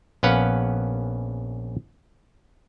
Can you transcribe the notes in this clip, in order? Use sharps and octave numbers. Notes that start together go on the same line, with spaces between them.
A#1 B3 C#4 B4 F5 F#5